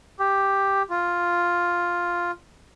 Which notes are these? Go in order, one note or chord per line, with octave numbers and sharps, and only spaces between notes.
G4
F4